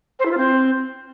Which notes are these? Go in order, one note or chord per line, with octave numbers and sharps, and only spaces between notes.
C5
E4
F4
C4